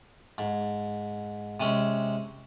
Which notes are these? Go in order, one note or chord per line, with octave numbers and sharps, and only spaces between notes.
G#2
C3 G#3 C#4